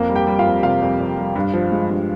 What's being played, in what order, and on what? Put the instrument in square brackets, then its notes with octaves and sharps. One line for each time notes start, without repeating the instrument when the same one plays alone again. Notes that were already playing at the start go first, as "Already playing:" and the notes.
Already playing: [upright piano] F2 A#3 A#4
G3
G4 G5
G3
F4 F5
F2
C3 F4 F5
F2
F2
G3
G2
F3
G#3
G2